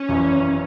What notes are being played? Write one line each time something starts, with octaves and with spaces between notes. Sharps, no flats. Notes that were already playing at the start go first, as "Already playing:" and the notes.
Already playing: C#4
G#1 F#2 E3